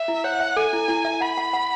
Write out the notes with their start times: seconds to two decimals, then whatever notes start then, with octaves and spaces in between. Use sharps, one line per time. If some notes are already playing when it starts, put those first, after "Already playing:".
Already playing: E5
0.08 E4
0.24 C#5 F#5
0.40 E5
0.56 A4 G#5
0.73 E4
0.88 E4
1.05 E5
1.21 F#5 B5
1.37 F#5
1.53 F#5